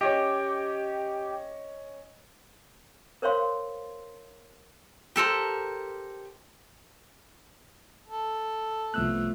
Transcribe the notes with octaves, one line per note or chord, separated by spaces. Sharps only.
C#4 G4 C#5 D#5
A#4 C5 C#5 F5 C6
G4 A4 A#4 C5
A4
C2 F3 A3 B3 E6 F#6